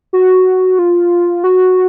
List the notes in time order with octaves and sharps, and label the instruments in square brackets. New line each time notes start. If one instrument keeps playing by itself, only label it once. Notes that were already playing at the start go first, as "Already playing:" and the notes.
[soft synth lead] F#4
F4
F#4